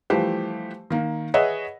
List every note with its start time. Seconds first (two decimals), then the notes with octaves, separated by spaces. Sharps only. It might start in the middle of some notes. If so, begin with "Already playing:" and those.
0.10 E3 F3 G3 A3 G4 C5
0.90 D#3 A#3
1.34 G#4 B4 C#5 D#5 E5 F#5